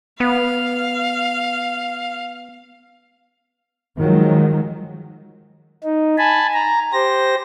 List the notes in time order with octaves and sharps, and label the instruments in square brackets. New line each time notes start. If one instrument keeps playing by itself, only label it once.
[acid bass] B3 [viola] F5
[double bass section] D#3 F3 F#3 G#3
[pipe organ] D#4
G#5 A5 B5
A#5
G4 C5 A#6